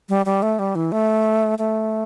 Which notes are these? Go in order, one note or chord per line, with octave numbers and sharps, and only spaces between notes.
G3
G3
A3
G3
E3
A3
A3